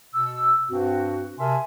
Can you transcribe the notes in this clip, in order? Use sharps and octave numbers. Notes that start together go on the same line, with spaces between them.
B2 E6
G2 C4 F#4
C3 A#4 E5 G#5 A5 C6